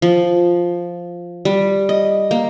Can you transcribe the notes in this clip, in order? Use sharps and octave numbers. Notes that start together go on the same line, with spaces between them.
F3
G3
D#5
A#3